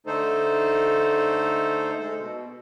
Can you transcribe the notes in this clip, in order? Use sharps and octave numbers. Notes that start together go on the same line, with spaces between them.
D3 A3 D#4 A4 C5
G#3 A4
B2